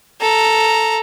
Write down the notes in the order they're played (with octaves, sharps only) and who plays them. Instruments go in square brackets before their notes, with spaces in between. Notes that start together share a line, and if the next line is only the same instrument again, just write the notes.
[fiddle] A4 A#5